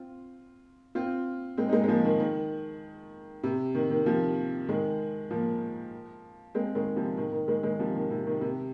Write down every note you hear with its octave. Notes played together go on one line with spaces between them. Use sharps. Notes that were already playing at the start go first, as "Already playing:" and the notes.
Already playing: C4 F4
C4 F4
G#3 C4
D#4
G#3 C4
G#3
F3 A#3
D#3
D#3
C3
D#3
D#3
C3 F3
D#3 G#3
F3 A#3
G#3 C4
D#3 G#3
C3 F3
D#3
D#3
D#3 G#3
D#3 G#3
C3 F3
D#3
C3
D#3
C3